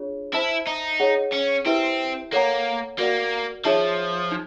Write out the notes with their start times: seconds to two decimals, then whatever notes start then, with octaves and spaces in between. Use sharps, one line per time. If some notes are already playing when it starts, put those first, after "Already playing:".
Already playing: D4 F4 G#4 C#5
0.33 E4 C5 E5 A5
0.67 D#4
1.00 G#4 C#5 F#5
1.33 C#4
1.65 C4 E4 G4 B4 E5
2.32 A#3 A4 C#5 F#5 A#5
2.99 A#3 F#4 A#4 D5 F#5
3.65 F3 D#4 G#4 C#5 E5 A5
4.32 D#4